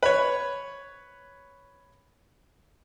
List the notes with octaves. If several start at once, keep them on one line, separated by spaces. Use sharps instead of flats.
B4 C#5